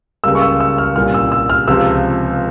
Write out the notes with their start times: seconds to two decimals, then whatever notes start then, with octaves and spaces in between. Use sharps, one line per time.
0.24 C#2 C#3 G3 A#3 E6
0.35 C#6
0.42 E6
0.60 E6
0.78 F6
0.95 C2 A#2 G3 C#4 F6
1.14 E6
1.32 E6
1.50 F6
1.68 C#2 C3 F3 E6